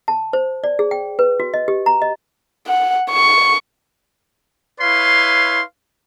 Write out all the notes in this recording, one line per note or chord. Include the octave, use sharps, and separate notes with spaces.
A5
C5
D5
G#4
G5
B4
F#4
D#5
G4
A#5
D#5
F#5
C#6
E4 B4 C#5 F5 C6